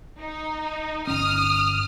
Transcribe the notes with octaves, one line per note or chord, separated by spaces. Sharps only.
D#4
G1 C#4 D#6 F6